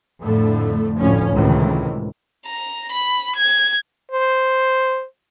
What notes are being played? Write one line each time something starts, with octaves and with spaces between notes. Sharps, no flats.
F2 A2 D3 A3
F1 D2 A2 F3 C#4
C#2 A2 C3 D#3 E3
A#5
B5
G#6
C5